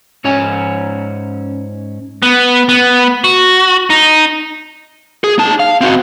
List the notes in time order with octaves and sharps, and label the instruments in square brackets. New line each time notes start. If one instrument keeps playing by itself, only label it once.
[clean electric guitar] G#2 C#4 C#5 G#5
[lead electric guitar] B3
B3
F#4
D#4
G#4
D#4 A5
F5
C4 F#4